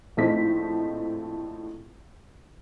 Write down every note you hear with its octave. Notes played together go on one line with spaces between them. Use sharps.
A#1 A2 A3 C4 D#4 B6